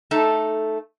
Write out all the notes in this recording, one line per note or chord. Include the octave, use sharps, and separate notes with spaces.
A3 D#4 A4